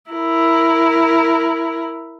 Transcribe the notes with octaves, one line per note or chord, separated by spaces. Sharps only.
E4 A#4